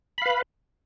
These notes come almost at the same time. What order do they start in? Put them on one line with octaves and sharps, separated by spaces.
B5 F5 B4